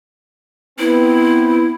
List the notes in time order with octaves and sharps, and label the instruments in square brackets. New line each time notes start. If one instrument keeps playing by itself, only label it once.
[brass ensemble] B3 C4 [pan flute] E4